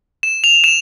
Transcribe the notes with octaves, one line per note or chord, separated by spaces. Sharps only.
E7
F7
E7